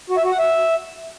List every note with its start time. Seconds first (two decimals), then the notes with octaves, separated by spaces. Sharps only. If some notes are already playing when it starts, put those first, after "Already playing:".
0.10 F#4
0.17 E5
0.25 F#4
0.32 F#5
0.39 E5